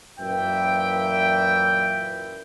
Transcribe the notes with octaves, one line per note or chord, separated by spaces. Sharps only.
F#2 A#2 E3 E5 G5